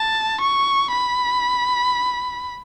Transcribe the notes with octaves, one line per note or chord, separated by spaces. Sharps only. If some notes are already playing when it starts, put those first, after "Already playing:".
Already playing: A5
C#6
B5